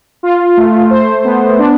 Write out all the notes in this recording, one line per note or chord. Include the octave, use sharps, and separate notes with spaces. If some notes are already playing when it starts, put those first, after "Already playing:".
F4
A3
C5
B3
D4